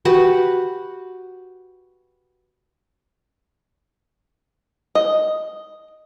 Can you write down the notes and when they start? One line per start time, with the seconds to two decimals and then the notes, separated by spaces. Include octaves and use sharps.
0.05 F#4 G4 B4 F#5
4.95 D#5